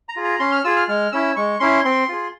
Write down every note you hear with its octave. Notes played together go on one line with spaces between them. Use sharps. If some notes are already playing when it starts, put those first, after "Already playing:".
A#5
F4 G#4
A#5
C#4 C6
F6
F4 G#4 E6
F6
G#3 F6
C#4 E4 E6
G#3 C#6
C#4 E4 C6
C4 C6
F4 G#4